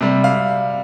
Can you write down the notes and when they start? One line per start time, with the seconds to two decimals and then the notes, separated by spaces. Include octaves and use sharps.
0.01 C3 G3
0.24 F5